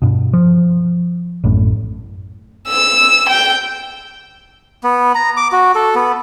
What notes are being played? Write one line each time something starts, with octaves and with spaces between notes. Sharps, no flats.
G2 B2
F3
A1 F#2 A2
E6
G5
B3
A#5
D6
F#4
A4
B3